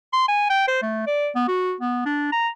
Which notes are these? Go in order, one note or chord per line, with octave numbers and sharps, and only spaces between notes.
C6
G#5
G5
C5
A3
D5
B3
F#4
B3
D4
A#5